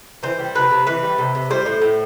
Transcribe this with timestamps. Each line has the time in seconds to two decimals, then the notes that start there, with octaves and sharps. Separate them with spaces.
0.23 E3 C5
0.39 G3
0.55 C3 B4
0.71 C3
0.87 E3 B4
1.03 G3
1.18 C3
1.35 C3
1.50 G3 C5
1.66 A2
1.82 A2